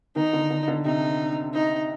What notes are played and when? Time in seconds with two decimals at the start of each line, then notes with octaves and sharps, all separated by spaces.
0.16 D#3 D#4
0.33 D3
0.50 D3
0.68 D3
0.85 C3 D#4
1.54 D#4